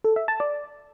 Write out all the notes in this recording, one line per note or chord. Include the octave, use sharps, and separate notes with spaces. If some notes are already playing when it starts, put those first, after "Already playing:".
A4
E5
A5
D5